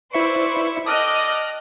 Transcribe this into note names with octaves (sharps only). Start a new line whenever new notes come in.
E4 B4 C5 D5 E5 C#6 C#7
A4 D5 D#5 G5 D#6 F6 F#6